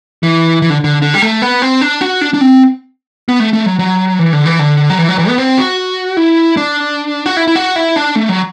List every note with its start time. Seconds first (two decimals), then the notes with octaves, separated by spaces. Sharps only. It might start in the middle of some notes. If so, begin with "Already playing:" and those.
0.23 E3
0.62 E3
0.70 D3
0.84 D3
1.02 D3
1.14 G3
1.22 A3
1.42 B3
1.62 C4
1.81 D4
2.01 F#4
2.21 D4
2.34 D4
2.41 C4
3.28 B3
3.40 A3
3.53 A3
3.66 F#3
3.79 F#3
4.19 E3
4.33 D3
4.46 E3
4.59 D3
4.90 F#3
4.98 E3
5.09 F#3
5.19 E3
5.28 B3
5.38 C4
5.58 F#4
6.17 E4
6.57 D4
7.26 F#4
7.37 E4
7.47 E4
7.56 F#4
7.76 E4
7.96 D4
8.16 A3
8.29 F#3